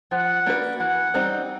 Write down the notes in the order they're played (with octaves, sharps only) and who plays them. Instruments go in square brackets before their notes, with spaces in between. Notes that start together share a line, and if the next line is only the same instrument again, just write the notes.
[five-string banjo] F3 [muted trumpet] F#5
[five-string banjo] A#3 D4 F#4 B4
[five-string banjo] E3 [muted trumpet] F#5
[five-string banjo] G3 C4 D#4